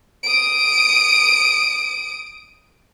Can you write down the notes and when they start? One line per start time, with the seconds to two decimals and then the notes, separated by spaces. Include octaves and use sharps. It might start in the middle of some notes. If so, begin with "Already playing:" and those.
0.23 D#6 D7